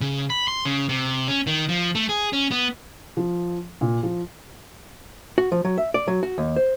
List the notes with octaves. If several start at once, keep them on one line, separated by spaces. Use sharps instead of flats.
C#3
B5
C6
C#3
C3
C#4
D#3
F3
A3
G#4
C#4
B3
F3
A#2
F3
F#4
F3
F#3
E5
D5
F#3
F#4
D#2
C5